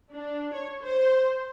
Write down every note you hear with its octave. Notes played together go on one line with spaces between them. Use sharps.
D4
C#5
C5